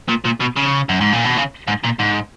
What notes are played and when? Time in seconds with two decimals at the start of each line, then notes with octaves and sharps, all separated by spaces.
0.09 A#2
0.25 A#2
0.41 B2
0.57 C#3
0.89 F#2
1.01 G#2
1.13 A#2
1.25 B2
1.37 C#3
1.68 G#2
1.84 A#2
2.00 G#2